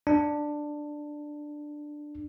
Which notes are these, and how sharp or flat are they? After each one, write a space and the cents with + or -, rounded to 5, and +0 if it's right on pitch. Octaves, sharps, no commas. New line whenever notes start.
D4 +10